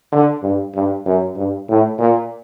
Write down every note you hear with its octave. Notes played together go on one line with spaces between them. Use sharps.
D3
G2
G2
F#2
G2
A2
A#2